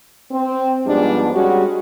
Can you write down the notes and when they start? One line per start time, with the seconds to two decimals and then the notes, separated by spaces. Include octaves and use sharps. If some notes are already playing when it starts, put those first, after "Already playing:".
0.31 C4
0.87 G#2 F3 G3 G#3 B3 D4
1.33 G3 G#3 C#4 F#4